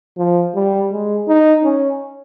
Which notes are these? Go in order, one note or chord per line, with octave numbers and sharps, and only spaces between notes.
F3
G3
G#3
D#4
C#4